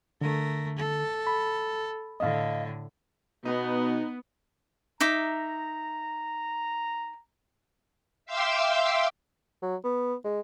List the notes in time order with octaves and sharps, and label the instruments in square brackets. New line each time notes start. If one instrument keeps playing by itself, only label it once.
[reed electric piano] D3 [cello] A3 A#4
[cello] A4
[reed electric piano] B5
[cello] A2 D3 [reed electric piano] D#5 F5
[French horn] B2 [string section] B3 [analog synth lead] D#4
[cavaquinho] D#4 E5 D6 [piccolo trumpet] A#5
[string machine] E5 F5 G5 C6 D6 E6
[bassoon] F#3
B3
G#3